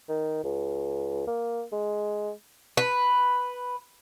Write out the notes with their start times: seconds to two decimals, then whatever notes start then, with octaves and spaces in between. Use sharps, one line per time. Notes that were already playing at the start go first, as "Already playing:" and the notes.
0.09 D#3
0.44 C#2
1.27 A#3
1.73 G#3
2.77 B4